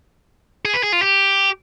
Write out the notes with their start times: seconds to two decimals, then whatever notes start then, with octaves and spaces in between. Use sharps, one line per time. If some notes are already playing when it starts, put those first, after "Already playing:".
0.65 G#4
0.74 B4
0.83 G#4
0.93 F4
1.02 G4